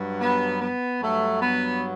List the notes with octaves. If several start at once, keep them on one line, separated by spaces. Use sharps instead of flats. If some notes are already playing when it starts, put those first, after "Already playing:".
Already playing: G2 F#3
B3
B3
G2 F#3 A3
B3